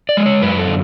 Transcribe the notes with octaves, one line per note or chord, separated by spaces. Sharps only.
D5
G#3
C#5
F#2 B4
A4
D3